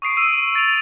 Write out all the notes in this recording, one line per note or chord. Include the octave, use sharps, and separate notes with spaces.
C#6 D#6 C7 D7
E6 D#7
A6 D7 F7